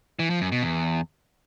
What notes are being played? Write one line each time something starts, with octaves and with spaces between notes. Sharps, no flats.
E3
F3
F#2
B2
E2